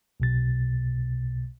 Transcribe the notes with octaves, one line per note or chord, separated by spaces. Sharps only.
B1 B2 A6